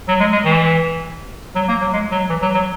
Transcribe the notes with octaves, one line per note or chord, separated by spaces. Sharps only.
F#3
G#3
G#3
E3
F#3
A#3
F#3
G#3
F#3
E3
F#3
F#3